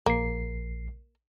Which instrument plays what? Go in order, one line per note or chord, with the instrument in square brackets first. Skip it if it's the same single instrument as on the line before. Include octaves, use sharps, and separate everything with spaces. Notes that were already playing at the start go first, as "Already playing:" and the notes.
[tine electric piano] A#1 C7 [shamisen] A#3